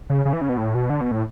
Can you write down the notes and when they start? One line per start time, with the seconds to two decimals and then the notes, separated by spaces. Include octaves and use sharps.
0.10 C#3
0.25 C#3
0.33 E3
0.41 C#3
0.49 B2
0.57 A2
0.75 B2
0.90 D3
1.01 B2
1.11 A2